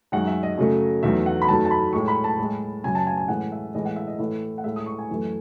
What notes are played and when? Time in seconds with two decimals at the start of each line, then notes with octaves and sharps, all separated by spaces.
0.12 F#2 D#3 G#3 F#5
0.27 E5
0.43 D#5
0.57 F#2 C#3 F#3 A3
1.03 E2 D#3 F#3 A3 E5
1.26 F#5
1.42 B5
1.48 F#2 D#3 F#3 A3 A5
1.65 A5
1.71 B5
1.93 A2 G#3 C#6
2.08 B5
2.24 A5
2.39 A2 G#3
2.84 F#2 C#3 F#3 G#5
2.95 A5
3.07 G#5
3.17 G#5
3.28 A2 E3 G#3 F#5
3.52 E5
3.74 A2 E3 G#3 D#5
3.85 F#5
3.96 E5
4.08 D#5
4.19 A2 E3 A3 E5
4.58 F#5
4.64 A2 G#3 E5
4.76 D#6
4.86 C#6
4.99 G#5
5.10 F#2 E3 A3